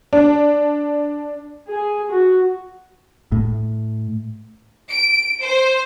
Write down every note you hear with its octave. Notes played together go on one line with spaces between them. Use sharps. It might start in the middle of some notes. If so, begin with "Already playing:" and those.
D4
G#4
F#4
A2
D7
C5